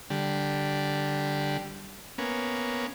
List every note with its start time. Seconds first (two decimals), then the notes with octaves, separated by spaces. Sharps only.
0.10 D3 G3
2.18 A#3 B3 C#4